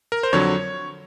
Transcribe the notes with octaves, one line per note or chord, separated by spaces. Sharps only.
A#4
C5
F2 D3 F#3 C#5